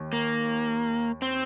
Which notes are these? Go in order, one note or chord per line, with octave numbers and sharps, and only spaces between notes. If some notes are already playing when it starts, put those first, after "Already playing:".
Already playing: D#2
A#3
C4